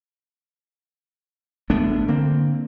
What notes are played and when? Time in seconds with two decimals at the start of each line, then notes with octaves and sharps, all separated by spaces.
1.70 G#1 A3 B3 D4
2.08 D3 A#3 C4